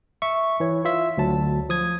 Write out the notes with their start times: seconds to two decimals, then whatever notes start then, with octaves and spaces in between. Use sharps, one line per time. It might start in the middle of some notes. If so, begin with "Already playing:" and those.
0.22 E5 C#6
0.60 E3 C#5
0.85 F4 E5
1.18 D2 F#3 A5
1.69 F3 D#6 G#6